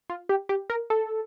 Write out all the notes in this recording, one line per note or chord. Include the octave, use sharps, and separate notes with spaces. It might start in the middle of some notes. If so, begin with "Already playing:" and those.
F4
G4
G4
A#4
A4